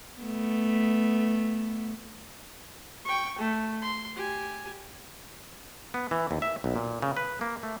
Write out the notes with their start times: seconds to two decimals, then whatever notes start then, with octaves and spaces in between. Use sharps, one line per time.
0.20 A3 B3
3.05 G5 C#6
3.38 A3
3.82 C6
4.15 G4 G#5
5.94 B3
6.11 E3
6.31 D#2
6.42 E5
6.64 B1
6.76 A#2
7.02 C#3
7.17 B4
7.41 A#3
7.63 A3